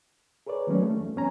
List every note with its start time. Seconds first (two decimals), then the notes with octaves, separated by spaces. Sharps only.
0.47 G#4 A#4 B4 C#5 D5
0.67 D#3 F#3 A3 A#3 C#4
0.82 A3
1.00 E2
1.16 F#2 B3 C#4 G#5 A#5